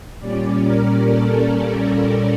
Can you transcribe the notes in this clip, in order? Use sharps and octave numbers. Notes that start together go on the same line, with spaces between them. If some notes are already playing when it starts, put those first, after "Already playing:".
A#2 G3 C#4 D5
A#4
A4